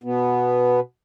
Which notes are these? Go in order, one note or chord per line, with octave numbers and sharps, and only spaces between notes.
B2 B3